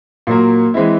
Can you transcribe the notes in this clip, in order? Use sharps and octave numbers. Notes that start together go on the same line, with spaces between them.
A#2 F#3 A#3
E3 G#3 C4 E4